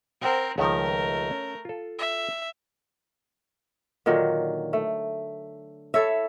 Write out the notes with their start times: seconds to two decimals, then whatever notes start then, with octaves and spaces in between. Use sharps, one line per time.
0.21 C4 A#4 C5 F#5 G5
0.58 C#2 D#3 F3 A3 A#4
1.31 C#4
1.65 F4 A4
1.99 E5
4.06 A#2 D3 D#3 F#3
4.73 A3
5.94 E4 A4 C#5 E5